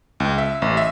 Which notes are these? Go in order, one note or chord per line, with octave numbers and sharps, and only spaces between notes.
C#2
E5
A1
E5